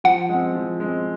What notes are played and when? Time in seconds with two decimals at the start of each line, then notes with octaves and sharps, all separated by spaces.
0.04 F3 F#5
0.29 G#3 C4
0.54 F3
0.80 G#3 C4